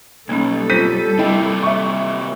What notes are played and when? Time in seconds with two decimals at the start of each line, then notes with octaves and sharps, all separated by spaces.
0.29 B1 G3 A#3 C#4 A4
0.70 C4 F4 C5 G6 B6 D#7
1.19 C3 A#3 E4 D#5 G5
1.63 E5 C#6